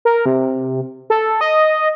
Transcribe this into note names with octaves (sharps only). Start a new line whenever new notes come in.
A#4
C3
A4
D#5